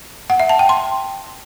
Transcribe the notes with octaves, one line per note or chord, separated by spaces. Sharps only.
F#5
E5
A5
G5
C6